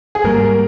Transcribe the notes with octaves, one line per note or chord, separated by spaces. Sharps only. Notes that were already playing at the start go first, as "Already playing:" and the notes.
G#4
G#2 G3 A#3 A#4